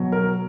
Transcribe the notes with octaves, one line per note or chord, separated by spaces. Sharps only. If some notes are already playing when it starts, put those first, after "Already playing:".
Already playing: B2 F#3
A#4